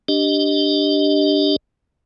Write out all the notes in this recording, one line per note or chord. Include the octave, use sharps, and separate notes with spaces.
D4 G4 D#5